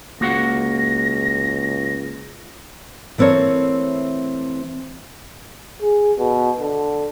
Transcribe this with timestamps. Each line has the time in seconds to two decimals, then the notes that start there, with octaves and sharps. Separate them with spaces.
0.21 C#2 A#3 F#4 F#5 A#6
3.18 E3 A3 C4 A#4 C#5
5.82 G#4
6.18 B2
6.59 D3